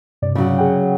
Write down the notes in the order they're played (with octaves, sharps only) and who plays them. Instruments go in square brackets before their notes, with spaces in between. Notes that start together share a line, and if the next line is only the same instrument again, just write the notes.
[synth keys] G2 C3 D5
[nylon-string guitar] C#3 F#3
[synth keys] G#4 F#5 G5